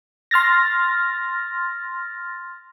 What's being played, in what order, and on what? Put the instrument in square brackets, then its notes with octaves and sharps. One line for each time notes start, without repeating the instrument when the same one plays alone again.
[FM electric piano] C6 F6 A6 A#6